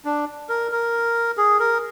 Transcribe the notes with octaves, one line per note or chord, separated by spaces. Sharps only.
D4
A#4
A#4
G#4
A#4